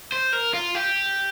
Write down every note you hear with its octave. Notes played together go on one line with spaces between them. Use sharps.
C5
A#4
F4
G4